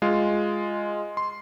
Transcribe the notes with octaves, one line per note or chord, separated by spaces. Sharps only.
G#3 F4
C6